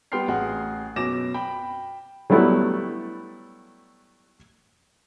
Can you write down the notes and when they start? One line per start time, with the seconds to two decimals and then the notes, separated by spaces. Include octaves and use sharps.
0.12 G3 B3 G5 C6 F6 C7
0.28 A1 F#4 G#4
0.96 F#2 B2 D6 A#6 E7
1.34 G5 B5
2.30 F#3 G3 A3 B3 E4